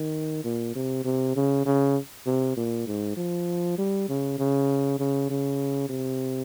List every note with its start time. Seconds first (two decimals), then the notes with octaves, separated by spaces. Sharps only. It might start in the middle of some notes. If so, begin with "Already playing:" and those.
Already playing: D#3
0.44 A#2
0.75 C3
1.05 C3
1.36 C#3
1.66 C#3
2.26 C3
2.57 A#2
2.87 G#2
3.17 F3
3.78 G3
4.09 C#3
4.39 C#3
4.99 C#3
5.30 C#3
5.89 C3